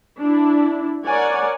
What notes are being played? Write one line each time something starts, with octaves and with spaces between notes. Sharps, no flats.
D4 E4
A#4 C#5 D5 F#5 G#5